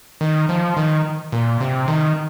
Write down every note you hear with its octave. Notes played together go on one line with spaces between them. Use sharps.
D#3
F3
D#3
A#2
C3
D#3